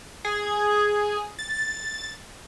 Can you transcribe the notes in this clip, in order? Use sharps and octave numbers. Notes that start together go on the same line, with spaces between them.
G#4
A6